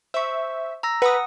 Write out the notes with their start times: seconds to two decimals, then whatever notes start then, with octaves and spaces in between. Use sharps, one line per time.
0.14 C5 E5 C#6
0.83 A#5 E6 A#6
1.02 B4 F#5 D#6